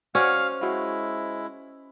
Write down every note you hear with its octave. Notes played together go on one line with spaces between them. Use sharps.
C#4 F#4 C5 D5 F5 F#5 F6
G#3 E4 F#4 F5